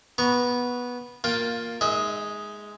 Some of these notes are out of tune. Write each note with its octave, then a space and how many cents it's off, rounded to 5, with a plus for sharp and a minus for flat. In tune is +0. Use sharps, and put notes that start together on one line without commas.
B3 -10 A#5 +0 C#6 +0
A#3 +0 F4 +10 G5 +0
G#3 +0 D#4 +0 E5 -35